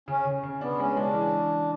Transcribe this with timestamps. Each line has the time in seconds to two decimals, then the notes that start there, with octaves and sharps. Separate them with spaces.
0.08 C#3 C#4
0.25 C#3
0.43 C#3
0.61 B3 D4
0.79 G#3 C#4
0.97 G#3 D4
1.14 E3